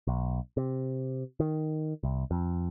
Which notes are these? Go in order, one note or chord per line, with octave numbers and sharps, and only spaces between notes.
B1
C3
D#3
C2
F2